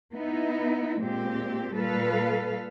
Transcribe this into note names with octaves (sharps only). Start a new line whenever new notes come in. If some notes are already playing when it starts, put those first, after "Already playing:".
B3 D#4 E4
A#2 G#3 C4 G4
A#2 G3 A4 B4 F5